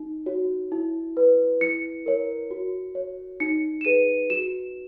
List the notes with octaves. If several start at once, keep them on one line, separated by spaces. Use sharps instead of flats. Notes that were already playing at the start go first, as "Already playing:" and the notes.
Already playing: D#4
F#4 C#5
E4
B4
E4 C#7
A#4 C#5
F#4
C#5
D#4 C#7
E7
G#4 B4 D#7
F#4 E7